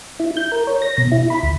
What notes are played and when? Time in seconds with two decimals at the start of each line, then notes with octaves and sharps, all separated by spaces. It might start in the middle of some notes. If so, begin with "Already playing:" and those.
0.20 E4
0.37 G6
0.52 A#4
0.67 C#5
0.82 A#6
0.98 B2
1.12 E4
1.30 B5
1.43 D2